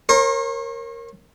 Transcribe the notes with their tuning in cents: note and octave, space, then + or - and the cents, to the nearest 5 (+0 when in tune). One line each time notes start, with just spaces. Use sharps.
A#4 +0 C#5 -40 C6 +45